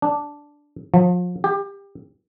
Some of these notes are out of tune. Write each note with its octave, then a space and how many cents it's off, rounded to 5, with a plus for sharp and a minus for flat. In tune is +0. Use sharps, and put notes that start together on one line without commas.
D4 -5
F3 +35
G4 +25